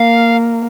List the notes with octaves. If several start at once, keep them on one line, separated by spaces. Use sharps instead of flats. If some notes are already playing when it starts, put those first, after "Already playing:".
Already playing: A#3 F5